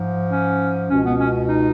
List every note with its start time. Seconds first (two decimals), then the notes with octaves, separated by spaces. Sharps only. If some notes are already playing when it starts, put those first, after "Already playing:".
Already playing: G#2 F3
0.31 C#4
0.89 C#2 B2 C#4
1.05 B3
1.19 C#4
1.49 D#4